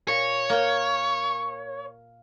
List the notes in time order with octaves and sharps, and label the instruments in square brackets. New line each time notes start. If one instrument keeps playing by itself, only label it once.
[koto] A#2 [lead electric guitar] C#5
[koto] A#3 G5